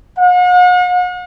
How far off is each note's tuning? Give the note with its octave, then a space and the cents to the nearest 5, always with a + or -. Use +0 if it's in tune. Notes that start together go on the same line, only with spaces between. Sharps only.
F#5 -45